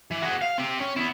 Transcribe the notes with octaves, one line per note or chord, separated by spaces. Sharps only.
E3
F#4 G#4
F5
C4 G4
C#4
B3 E4